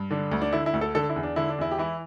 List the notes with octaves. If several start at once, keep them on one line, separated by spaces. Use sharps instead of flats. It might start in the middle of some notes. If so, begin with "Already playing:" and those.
Already playing: G2
D3 D4
D2
D4
D3 E4
E4
D2
A4
D3 A4
E4
E2
D4
D3 E4
D4
E2 E4
G4
E3 E4